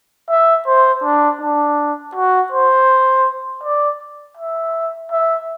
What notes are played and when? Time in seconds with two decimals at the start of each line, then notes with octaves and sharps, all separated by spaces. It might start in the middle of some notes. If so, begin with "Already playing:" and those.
0.29 E5
0.67 C5
1.04 D4
1.41 D4
2.15 F#4
2.52 C5
3.63 D5
4.37 E5
5.11 E5